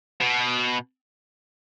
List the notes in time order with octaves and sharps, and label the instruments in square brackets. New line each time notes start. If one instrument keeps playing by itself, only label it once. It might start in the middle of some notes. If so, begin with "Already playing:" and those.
[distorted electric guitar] B2